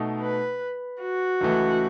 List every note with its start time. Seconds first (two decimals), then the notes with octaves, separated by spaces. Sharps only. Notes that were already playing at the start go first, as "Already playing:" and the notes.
Already playing: B2 A3 D#4
0.21 B4
1.02 F#4
1.41 C#2 C#3 E3 A3